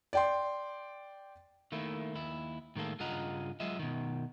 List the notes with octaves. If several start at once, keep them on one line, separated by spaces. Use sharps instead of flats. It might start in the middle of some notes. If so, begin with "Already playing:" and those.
D5 G5 C6
D#3 A3 A#3 E4
D#2 E4
A2 D#3 G#3 A#3 A4
G2 C#3 F4 D#5 F#5 A#5
F#3 G#3 F4 D#5 E5
B2 D#3